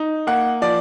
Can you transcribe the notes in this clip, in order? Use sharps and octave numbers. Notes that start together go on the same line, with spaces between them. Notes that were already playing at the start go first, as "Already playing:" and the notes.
Already playing: D#4
A#3 F#5
F3 D5